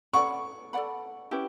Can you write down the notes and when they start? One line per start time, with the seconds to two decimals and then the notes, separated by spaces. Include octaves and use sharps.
0.13 A4 D5 F#5 B5 C#6
0.73 A4 D5 F#5 B5
1.31 C#4 E4 G4 B4